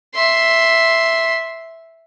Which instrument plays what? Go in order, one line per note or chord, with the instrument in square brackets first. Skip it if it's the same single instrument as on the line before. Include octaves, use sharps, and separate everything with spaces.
[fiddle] E5 C6